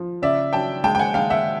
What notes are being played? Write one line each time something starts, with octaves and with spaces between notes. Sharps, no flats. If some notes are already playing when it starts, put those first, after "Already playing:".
Already playing: F3
C#3 D5 E5
F#3 G5 A5
G#3 G5 A5
G5
F#5 G#5
G#3 F5 G5
E5 F#5